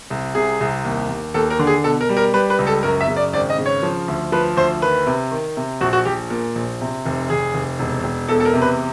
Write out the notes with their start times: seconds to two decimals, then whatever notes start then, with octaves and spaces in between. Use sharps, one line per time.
0.10 C2
0.35 C3 G#4
0.60 C2
0.85 D#2
1.09 D#2
1.34 D#2 A4
1.50 A#4
1.59 D3
1.67 G#4
1.84 B2 A4
2.01 A#4
2.09 G3
2.17 A#4
2.34 G3 B4
2.50 B4
2.59 C#2
2.67 A4
2.83 F#2 A#4
3.01 E5
3.08 C#3
3.16 D5
3.33 G#1 D5
3.50 D#5
3.58 C#3
3.66 C#5
3.83 F3
4.08 D2
4.32 F3 B4
4.57 D2 C5
4.82 D#3 B4
5.07 C3
5.31 D#3
5.57 C3
5.81 A#1 F#4
5.93 F#4
6.05 A#1 G4
6.30 A#2
6.55 A#1
6.81 C3
7.06 F1
7.30 F1 G#4
7.54 F1
7.79 E1
8.04 E1
8.29 E2 A4
8.40 A4
8.45 A#4
8.54 C3
8.62 B4